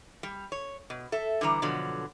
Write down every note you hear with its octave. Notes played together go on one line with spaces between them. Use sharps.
G3
C#5
B2
A4 E5
D3 E3 G3 A#5
B2 D3 F3 F#3